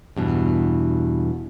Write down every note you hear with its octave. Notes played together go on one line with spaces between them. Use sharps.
E2 G2 B2